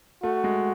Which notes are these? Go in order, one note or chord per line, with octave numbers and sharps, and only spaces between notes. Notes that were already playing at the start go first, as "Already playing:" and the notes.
A3 F#4
G#3